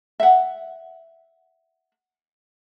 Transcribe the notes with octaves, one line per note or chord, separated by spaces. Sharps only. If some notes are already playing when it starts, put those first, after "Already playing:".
E5 F#5